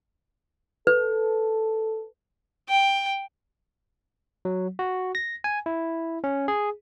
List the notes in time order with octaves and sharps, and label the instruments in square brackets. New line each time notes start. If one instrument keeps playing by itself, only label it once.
[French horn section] A4 [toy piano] B4
[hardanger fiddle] G5
[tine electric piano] F#3
F#4
A#6
G#5
E4
C#4
G#4